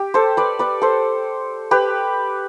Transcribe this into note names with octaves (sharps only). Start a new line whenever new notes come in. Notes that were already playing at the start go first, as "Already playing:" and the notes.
Already playing: G4
A4 C5
B4 D5
B4 D5
A4 C5
G4 B4